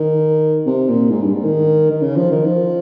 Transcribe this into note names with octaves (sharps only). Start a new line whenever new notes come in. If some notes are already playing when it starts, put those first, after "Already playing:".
Already playing: D#3
C3
A#2
G#2
G2
G#2
D#3
D#3
C#3
F3
D#3
F3